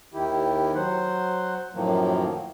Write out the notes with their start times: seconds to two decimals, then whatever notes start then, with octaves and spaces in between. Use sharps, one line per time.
0.14 D#2 D#3 E4 G4
0.75 F#3 C5 F#5
1.74 F#2 A2 D#3 F3 F#3 A#3